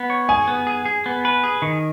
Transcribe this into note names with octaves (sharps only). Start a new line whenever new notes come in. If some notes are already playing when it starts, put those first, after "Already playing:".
Already playing: B3
C#5
G#4 G#5
B3
G#4
G#4
B3
B4
G#4
D#3